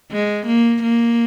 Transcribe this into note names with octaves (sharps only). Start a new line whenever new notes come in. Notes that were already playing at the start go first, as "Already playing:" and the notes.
G#3
A#3
A#3